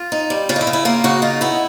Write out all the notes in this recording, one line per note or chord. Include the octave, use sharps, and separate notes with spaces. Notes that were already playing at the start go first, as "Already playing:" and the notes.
Already playing: F4
D#4
G3
C#3 F4
D#4
E4
C#3
E4
A#3 F4
C#3 F#4
D#4 F4
B3 E4